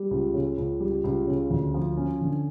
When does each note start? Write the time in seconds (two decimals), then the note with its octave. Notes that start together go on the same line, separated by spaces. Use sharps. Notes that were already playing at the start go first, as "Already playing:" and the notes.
Already playing: G3
0.11 C#2
0.34 C#3
0.57 C#2
0.80 G3
1.04 C#2
1.27 C#3
1.50 D2
1.74 F3
1.97 C#4
2.21 D3